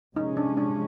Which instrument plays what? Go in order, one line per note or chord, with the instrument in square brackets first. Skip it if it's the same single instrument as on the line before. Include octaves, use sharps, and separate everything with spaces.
[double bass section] C3 F3 G#3 C#4 [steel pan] D#4
[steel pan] D4
D4